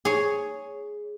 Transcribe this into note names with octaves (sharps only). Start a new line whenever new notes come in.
G#4 C#5